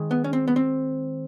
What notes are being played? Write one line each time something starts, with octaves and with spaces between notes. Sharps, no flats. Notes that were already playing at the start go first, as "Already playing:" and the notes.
Already playing: D#3 G#3
B3
C#4
C4
B3
C4